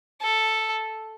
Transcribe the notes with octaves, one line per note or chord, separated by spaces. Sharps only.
A4